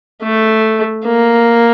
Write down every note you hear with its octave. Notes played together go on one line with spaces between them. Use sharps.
A3
A#3